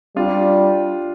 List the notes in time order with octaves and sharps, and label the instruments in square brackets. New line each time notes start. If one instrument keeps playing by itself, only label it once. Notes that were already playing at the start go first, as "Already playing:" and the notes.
[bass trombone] G3 [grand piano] D4 F4